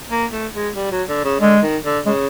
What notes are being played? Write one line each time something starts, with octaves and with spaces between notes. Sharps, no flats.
A#3
A3
G#3
G3
F#3
D3
C#3
D3 G#3
D#3
D3
C#3 G#3